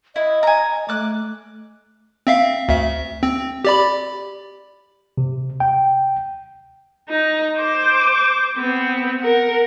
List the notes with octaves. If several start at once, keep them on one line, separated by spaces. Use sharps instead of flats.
E4 D#5
G#5 A#5
D#5
A3 D6 F#6
C4 E5 F5
D2 E5
C4
G4 D5 B5
C3
G5
D#4 A#5
C5 D6
B3 C4
A#4 F#5